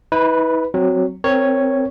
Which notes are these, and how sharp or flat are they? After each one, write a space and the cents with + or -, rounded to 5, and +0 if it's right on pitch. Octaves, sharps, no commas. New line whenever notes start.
E4 -45 B4 +0
F#3 +0 C4 -5
C4 +0 A#4 +0 C#5 +0